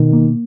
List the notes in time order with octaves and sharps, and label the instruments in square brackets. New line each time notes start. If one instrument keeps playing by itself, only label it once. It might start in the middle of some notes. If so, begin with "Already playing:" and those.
Already playing: [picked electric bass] B2 [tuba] D#3
[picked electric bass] A#3